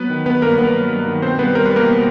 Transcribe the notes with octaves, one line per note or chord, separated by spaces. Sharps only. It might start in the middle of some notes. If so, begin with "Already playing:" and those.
Already playing: F#3 B3 B4
D#3
D#3 B3 B4
G2 A#3 A#4
G2 B3 B4
F#3
G2
D#3
B2 C4 C5
G3 B3 B4
G3 A#4
B4
B2 A#3 A#4
B2